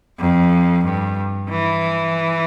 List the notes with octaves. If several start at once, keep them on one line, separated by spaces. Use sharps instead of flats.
F2
G2
E3